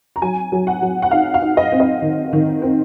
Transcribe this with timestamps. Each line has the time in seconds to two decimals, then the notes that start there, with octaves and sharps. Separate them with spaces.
0.16 A#5
0.22 F#3 G#5
0.52 F#3
0.67 F#5
0.82 F#3
1.02 F#5
1.11 D#4 F5
1.34 F5
1.42 D#4
1.57 D#5
1.72 C4
1.80 D#5
2.02 D#3
2.33 D#3
2.62 C4